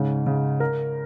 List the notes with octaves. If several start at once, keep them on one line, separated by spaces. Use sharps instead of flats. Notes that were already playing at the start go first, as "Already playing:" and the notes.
Already playing: G#2 C#3 C#4
C#3
A#4